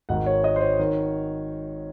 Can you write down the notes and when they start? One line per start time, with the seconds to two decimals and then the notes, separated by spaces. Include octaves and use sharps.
0.09 G#1 G#2 D#3 F#5
0.26 C#5
0.44 D#5
0.56 C5
0.61 C#5
0.79 D#3